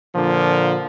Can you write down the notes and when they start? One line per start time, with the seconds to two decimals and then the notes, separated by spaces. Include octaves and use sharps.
0.15 A#2 D3 F3